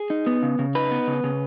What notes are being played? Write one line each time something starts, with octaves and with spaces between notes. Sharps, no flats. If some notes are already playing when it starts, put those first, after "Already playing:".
Already playing: G#4
D#4
B3
C#3
C#3
D#4 B4
B3
C#3
C#3